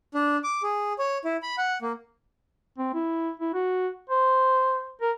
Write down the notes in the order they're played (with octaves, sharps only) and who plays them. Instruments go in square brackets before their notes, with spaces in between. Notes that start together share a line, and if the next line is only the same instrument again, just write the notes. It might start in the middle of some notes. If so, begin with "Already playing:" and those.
[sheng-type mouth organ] D4
D6
G#4
C#5
E4
B5
F#5
A#3
[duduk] C4
E4
E4
F#4
C5
A#4